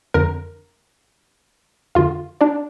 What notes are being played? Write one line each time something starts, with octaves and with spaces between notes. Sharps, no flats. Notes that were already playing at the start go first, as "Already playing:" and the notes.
F2 D3 A#4 A#5
F2 D3 F4 F5
D4 D5